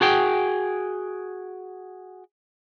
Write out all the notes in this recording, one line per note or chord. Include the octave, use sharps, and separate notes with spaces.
F#4 G#4 G5